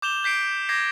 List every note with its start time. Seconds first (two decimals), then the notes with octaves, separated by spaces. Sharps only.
0.02 D6 G6 E7 F7 G7
0.24 G6 B6 C7 D7
0.69 D6 G6 G#6 A#6 C7